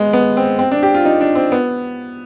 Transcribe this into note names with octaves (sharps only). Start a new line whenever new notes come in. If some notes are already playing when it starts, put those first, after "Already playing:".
Already playing: G#3 B3
B3
C4
C4
D4
G4
F4
D#4
D4
C4
B3